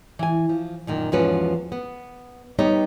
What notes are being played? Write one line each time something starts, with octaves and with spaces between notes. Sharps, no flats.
E3 G#5
F3
F#2 A#2 D#3
E2 G#2 F3 C#4 F#4 B4
B3
G3 B3 D#4 G4 C#5 D#5